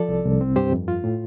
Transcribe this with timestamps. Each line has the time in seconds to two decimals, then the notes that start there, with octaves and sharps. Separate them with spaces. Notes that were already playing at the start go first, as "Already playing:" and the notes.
Already playing: F3 A4 D5
0.09 C2
0.25 C2
0.41 C4
0.56 G2 G4 C5
0.72 F2
0.88 F4
1.04 A2